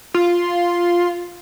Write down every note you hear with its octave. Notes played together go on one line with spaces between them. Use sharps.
F4